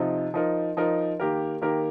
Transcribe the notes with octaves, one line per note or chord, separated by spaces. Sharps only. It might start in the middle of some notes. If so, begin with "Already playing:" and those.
Already playing: C3 F3 D#4
F3 D#4 A#4
F3 D#4 A#4
D#3 A#3 G4 A#4
D#3 A#3 G4 A#4